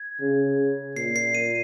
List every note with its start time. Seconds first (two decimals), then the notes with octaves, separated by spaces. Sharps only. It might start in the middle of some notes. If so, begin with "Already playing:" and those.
Already playing: G#6
0.20 C#3
0.96 A#2 C7
1.16 C7
1.35 D#7